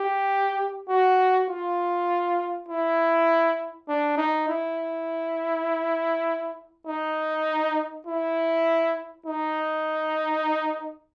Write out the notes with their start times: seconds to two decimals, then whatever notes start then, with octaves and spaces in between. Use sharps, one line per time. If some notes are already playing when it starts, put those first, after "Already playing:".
Already playing: G4
0.88 F#4
1.49 F4
2.69 E4
3.88 D4
4.17 D#4
4.48 E4
6.87 D#4
8.07 E4
9.26 D#4